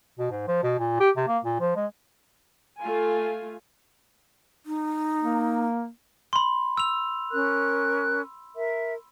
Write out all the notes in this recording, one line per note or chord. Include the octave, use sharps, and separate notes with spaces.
B2
G#2
F3
B2
A#2
G4
C3
A#3
A#2
F3
G#3
A3 F4 G#5
D#4
A#3
B5 C6
E6 F7
C#4 A#4 F#6
A#4 E5